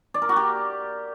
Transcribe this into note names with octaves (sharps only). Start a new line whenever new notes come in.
D5
A#4
F#4
G4